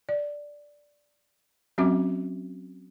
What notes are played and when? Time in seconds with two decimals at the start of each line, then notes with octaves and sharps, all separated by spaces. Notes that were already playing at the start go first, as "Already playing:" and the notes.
0.09 D5
1.78 F#3 C4 C#4 F#4 E5 D6